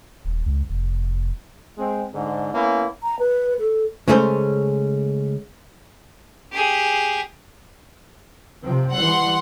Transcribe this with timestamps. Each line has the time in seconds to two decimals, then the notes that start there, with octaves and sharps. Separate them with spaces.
0.25 D#1
0.46 C#2
0.70 F1
1.77 G#3 C4
2.13 G#2 D3
2.53 A#3 B3 C#4 E4
3.03 A#5
3.19 B4
3.59 A4
4.08 C#3 G#3 A3 C#4 G#4 C5
6.52 G4 G#4
8.62 C3 F3 C4
8.93 E3 G3 F#5 C6